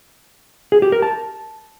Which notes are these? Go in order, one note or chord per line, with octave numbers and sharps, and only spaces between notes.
G#4
G4
A#4
A5